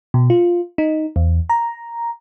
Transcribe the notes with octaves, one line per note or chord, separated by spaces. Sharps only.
B2
F4
D#4
E2
A#5